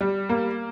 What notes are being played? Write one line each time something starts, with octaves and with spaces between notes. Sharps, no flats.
G3
A#3